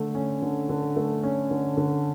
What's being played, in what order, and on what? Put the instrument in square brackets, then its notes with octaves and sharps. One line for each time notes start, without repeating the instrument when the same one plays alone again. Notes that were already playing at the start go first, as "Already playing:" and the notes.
Already playing: [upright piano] D3 A3
C#4
D3
D3
A3
C#4
D3
D3